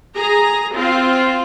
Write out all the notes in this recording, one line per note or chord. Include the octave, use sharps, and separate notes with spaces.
G#4 A#5
C4 F4